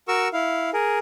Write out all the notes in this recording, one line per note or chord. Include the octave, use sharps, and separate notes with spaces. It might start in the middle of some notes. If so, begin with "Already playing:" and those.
F#4 A#4 C#6 E6
E4 F5
G#4 A#4